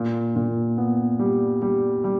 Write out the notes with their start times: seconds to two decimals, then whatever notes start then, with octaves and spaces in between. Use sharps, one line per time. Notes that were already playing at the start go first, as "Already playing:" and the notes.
Already playing: A#2
0.36 A#2
0.78 B3
1.19 G3
1.62 G3
2.04 G3